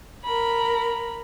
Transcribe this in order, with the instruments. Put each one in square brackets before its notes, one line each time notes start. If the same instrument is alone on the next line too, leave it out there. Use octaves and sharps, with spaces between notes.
[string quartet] A#4 B5